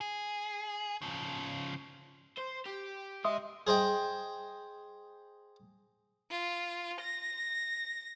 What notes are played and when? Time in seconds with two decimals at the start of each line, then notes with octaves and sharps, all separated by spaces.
0.01 G#4
1.02 C#3 F3
2.38 C5
2.66 G4
3.25 G#3 D#5 E5 C6 D#6
3.67 G#4 C5 D#5 G5
6.30 F4
7.00 A#6